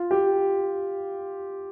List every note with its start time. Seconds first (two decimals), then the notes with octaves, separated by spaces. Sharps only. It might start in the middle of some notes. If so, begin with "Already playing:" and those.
Already playing: F4
0.11 G4